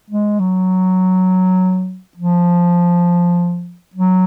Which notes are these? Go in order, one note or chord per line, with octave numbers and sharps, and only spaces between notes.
G#3
F#3
F3
F#3